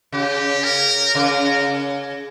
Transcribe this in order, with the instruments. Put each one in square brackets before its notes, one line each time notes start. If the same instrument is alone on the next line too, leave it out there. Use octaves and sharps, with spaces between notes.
[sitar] C#3 [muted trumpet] G4
[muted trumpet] A#4
[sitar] C#3 [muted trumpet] A#4